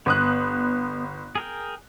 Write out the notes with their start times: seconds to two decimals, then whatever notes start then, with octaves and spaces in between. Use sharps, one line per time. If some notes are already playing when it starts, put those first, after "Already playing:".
0.06 G1 B3 D#6 F#6
1.35 G#4 A#4 G5